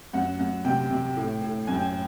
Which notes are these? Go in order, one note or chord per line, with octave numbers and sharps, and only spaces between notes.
F#2 F#5
F#2
C3 G5
C3
A2
A2
F#2 G#5
G5
G#5